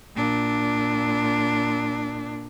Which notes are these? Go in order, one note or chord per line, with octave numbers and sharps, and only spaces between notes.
A#2 D4